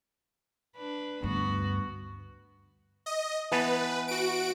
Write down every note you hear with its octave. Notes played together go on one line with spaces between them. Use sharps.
D4 B4
D2 G2 B3 F#4
D#5
E3 B3 B4 A5
F#4 D7